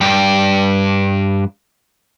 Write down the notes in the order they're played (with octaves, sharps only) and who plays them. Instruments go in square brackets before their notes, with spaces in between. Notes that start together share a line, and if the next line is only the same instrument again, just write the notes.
[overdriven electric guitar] G2 G4